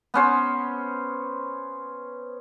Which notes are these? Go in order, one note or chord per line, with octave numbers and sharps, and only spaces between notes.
B3 C#4 C5